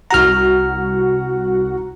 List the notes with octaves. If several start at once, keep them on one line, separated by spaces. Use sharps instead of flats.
C2 F#4 F#5 A#5 F6